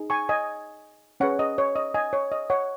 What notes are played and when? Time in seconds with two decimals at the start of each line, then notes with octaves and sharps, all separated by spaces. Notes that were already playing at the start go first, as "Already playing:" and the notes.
Already playing: D#4 G#4
0.10 G#5 C#6
0.29 D#5 G#5
1.20 C#4 G#4 B4 C#5 F#5
1.39 D#5
1.58 C#5
1.76 D#5
1.94 D#5 G#5
2.13 C#5
2.32 D#5
2.50 C#5 F#5